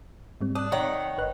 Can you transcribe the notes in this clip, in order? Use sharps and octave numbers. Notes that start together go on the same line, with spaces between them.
G#2 G3 C4
D4 D#6 F#6
D#3 C#5 F#5
G1 B4 F#6